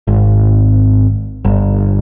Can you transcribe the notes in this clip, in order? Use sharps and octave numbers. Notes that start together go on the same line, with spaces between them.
G#1
G1